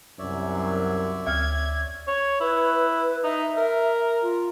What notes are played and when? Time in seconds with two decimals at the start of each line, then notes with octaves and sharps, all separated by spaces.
0.19 C2 F#2 C#5 D5 E5
1.27 D2 F6 G#6
2.08 C#5
2.41 E4 B4
3.24 D#4 E5
3.57 A#4
4.22 F4